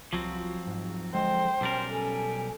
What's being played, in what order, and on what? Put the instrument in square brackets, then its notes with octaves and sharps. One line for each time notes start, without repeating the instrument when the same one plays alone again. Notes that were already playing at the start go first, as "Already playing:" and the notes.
[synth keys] C2 F4 F#4 [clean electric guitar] F3 F#3 C4
[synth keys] G#2
[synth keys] D3 G#3 [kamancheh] C5 [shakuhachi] G5
[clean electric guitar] B1 G3 A#4 [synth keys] C#4 A5
[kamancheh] A4 [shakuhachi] G#5